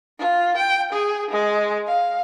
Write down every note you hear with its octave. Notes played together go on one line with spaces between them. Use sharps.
F4
G5
G#4
G#3
F5